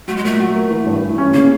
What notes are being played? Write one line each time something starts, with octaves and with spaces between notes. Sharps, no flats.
F#3 A3
G#3
A#2 A3
F#3
A#3
E3
G2
E3
C#4
C#3 A#3